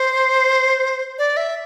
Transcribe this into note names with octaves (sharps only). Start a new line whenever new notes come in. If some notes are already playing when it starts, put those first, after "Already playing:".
Already playing: C5
D5
E5